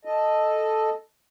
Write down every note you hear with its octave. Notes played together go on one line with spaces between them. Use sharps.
A4 D#5